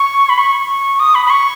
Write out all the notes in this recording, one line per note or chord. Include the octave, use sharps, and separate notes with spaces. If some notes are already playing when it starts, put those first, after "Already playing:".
Already playing: C#6
B5
C#6
D#6
B5
B5
C#6